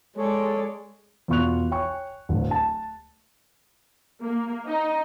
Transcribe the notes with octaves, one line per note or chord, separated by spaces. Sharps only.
G#3 G#4 A4 C#5 D5
E2 B2 F4 C#6 F#6 F7
C#5 G5 G#5 C#6
D1 D2
A5
A#3
D#4